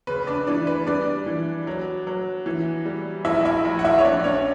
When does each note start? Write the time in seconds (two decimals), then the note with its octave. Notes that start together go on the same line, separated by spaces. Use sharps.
0.07 C#3 B4
0.27 D4 D5
0.47 E3 D4 D5
0.67 B4
0.87 G3 D4 D5
1.26 E3
1.67 F#3
2.07 F#3
2.46 E3
2.85 G3
3.25 A#1 E4 E5
3.45 E4 E5
3.65 A#1
3.79 F#5
3.85 E4 E5
3.98 C#5
4.05 A#1 D4 D5
4.24 C#4 C#5